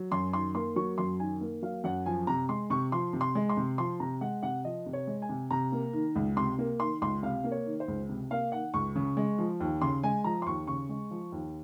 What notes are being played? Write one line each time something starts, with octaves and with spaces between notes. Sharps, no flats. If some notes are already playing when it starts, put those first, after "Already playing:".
Already playing: F#3
F#2 C6
D#3 C6
A#3 C6
F#3 C#6
F#2 C6
D#3 G#5
A#3
F#3 F5
F#2 F#5
F3 G#5
C3 A#5
G#3 C6
C3 C#6
F3 C6
C3
C6
G#3
C6
C3
F3 C6
C3 A#5
G#3 F#5
C3 F#5
F3 D#5
C3
C#5
G#3
G#5
C3
C3 A#5
A#3
D#3
C#2
C3 C6
A#3
D#3 C6
C#2 C6
C3 F5
A#3
C#5
D#3
C5
C#2
C3
A#3 F5
D#3 F#5
C#2 C#6
C#3
G#3
F3
D#2
C#3 C6
G#3 G#5
F3 A#5
C6
D#2 C#6
C#3 C#6
G#3
F3
D#2